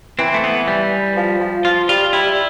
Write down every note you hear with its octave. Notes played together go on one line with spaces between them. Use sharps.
E3 C4
A3
B3
G3
F3
F3
F3 F4
G3 F4
G3 E4